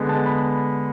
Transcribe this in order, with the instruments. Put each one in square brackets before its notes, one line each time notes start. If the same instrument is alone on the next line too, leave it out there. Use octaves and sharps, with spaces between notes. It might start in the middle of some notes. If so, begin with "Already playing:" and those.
Already playing: [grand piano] D3 G#3 B3
A5
B5